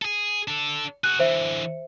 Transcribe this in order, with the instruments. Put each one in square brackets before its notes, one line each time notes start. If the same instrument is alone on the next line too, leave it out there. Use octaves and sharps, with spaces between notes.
[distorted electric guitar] G#4 A4
D4 A4
[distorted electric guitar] F#4 G#4 [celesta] F#6
[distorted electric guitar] D3 E3 [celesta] C5 E5